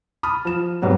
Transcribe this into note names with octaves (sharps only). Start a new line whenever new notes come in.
A5 B5 D#6 F6
F3 E7
F2 G#2 F#3 G3 B3